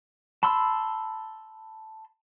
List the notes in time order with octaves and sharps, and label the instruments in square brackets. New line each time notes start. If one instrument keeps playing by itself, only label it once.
[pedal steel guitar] A5 B5 C6 E6